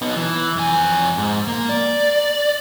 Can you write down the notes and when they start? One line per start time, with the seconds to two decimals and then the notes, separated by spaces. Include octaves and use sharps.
0.02 B3 D#4
0.16 E3
0.56 F2 G#5
1.18 G#2
1.48 A#3
1.69 D5